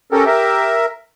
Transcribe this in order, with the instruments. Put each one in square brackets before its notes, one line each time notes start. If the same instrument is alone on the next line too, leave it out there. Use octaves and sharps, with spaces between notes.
[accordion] C#4 A4 A#4 [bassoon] G4
[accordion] A#4 E5